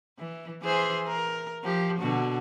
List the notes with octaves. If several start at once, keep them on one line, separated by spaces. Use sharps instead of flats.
E3
E3 G#4 C5
A#4
F3 G4
B2 D3 F#4